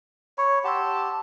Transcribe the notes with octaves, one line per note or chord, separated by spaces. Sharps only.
C#5 B5
G4 F#5 A5 C6 E6